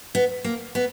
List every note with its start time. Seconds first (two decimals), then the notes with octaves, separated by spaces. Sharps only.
0.15 B3
0.44 A#3
0.75 B3